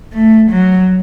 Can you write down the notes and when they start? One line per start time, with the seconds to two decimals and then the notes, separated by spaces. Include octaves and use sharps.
0.14 A3
0.51 F#3